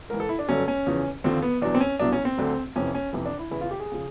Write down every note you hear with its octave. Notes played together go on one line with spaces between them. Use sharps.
G#2 E3 A#4
A4
E4
D4
G2 D3 F#3 C#4
C#4
E2 C#3 F3
D#2 D3 F3 C4
B3
E2 B2 F#3 D4
C4
C#4
C2 B2 F#3 D4
C#4
C4
D2 D3 F#3
F2 C3 E3 C#4
C#4
F2 C3 E3
D4
E4
E2 C#3 E3 E4
F4
G4
G#4
C#3 F3